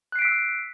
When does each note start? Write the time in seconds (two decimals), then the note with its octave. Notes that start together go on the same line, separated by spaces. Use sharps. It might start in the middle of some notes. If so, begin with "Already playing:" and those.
0.12 F#6
0.16 C7
0.19 D7
0.22 B6
0.25 E6